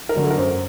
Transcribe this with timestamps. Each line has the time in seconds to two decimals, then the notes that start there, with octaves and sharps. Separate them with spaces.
0.09 A#4
0.16 D3 F#3
0.23 A4
0.31 A#4
0.37 F#2 C5